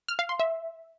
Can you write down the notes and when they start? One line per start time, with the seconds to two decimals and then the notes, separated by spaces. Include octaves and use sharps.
0.08 F6
0.19 F5
0.29 C6
0.40 E5